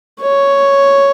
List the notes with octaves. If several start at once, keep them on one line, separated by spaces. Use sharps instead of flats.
C#5